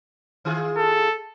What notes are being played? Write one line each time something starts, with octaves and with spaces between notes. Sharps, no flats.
D#3 F4 G#4
A4